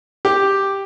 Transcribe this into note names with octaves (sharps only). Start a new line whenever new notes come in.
G4